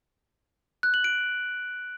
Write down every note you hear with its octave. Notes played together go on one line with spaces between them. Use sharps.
F#6
F#7
D7